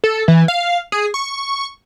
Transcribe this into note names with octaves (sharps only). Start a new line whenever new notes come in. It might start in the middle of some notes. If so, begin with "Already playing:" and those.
A4
E3
F5
G#4
C#6